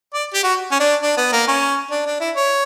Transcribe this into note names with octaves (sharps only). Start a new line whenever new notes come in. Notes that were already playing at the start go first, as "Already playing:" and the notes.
D5
G4
F#4
C#4
D4
D4
B3
A#3
C#4
D4
D4
E4
C#5